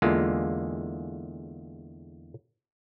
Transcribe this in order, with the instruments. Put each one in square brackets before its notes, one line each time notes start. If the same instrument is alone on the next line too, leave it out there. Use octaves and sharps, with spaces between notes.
[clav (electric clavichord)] E2 D3 G#3 A#3 F4